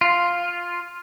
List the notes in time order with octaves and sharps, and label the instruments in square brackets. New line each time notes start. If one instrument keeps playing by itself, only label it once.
[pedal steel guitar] F4